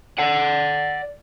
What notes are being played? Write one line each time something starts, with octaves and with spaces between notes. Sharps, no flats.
D5 F#5